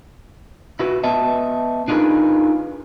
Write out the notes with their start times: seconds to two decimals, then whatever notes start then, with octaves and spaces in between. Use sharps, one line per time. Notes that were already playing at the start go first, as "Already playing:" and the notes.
0.79 E4 F#4 B4
1.04 B3 B4 D#5 E5 A5
1.88 D4 D#4 F4 G#4 A#4 B4